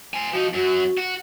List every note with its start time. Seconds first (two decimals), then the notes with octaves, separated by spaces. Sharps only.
0.14 C5 G#5
0.33 F3 D#4 F#4
0.53 F#2 F#3 F#4
0.98 F#4